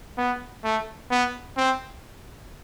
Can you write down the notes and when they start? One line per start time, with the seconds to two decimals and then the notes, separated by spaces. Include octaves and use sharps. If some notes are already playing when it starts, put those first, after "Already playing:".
0.18 B3
0.64 A3
1.11 B3
1.57 C4